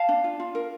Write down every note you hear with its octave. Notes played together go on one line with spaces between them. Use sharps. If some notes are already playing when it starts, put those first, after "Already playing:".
Already playing: F5 A5
D4
F4
F4
A#4